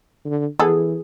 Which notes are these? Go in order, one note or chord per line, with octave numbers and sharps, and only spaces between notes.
D3
E3 B3 G#4 A4